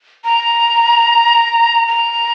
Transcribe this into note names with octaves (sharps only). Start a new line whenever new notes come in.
A#5
A#5